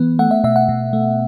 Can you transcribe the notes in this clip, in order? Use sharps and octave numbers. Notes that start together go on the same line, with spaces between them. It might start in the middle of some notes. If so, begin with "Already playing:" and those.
Already playing: E3 B3
A3 F#5
E5
B2 E5
F#5
B2
A3